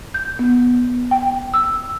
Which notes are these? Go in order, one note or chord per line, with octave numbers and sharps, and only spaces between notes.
G6
B3
G5
E6